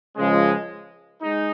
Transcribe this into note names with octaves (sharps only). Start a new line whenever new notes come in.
C#2 C#3 F3 G#3
G#3 D#4